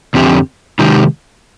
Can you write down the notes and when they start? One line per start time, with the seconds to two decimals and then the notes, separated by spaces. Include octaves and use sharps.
0.14 F2 D3 F3 C4 G4
0.79 C3 D#3 G#3 D#4 G4